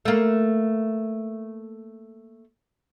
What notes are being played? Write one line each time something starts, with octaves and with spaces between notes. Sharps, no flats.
A3 A#3